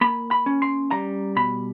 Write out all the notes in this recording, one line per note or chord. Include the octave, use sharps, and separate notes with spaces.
A#3 B5
B5
C#4
C6
G3 A#5
B2 B5